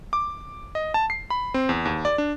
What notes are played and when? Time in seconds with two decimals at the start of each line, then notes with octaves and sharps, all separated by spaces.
0.13 D6
0.75 D#5
0.94 A5
1.10 C7
1.30 B5
1.54 C4
1.69 E2
1.85 D#2
2.05 D5
2.18 D4